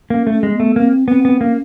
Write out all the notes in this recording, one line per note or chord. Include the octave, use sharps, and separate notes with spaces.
A#3 C#4
A3
C#4
G#3
A#3
B3
A3
A#3 C4
B3 C4
B3
A#3 C#4